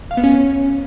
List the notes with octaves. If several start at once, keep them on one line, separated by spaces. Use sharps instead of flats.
F5
B3
C#4